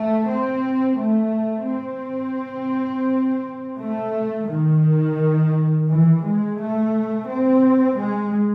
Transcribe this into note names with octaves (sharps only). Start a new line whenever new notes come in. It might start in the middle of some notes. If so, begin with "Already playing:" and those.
Already playing: A3
C4
A3
C4
A3
D#3
E3
G#3
A3
C4
G#3